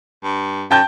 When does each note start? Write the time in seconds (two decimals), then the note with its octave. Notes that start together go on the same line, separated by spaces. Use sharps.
0.24 G2
0.71 F#2 G5 A5 G6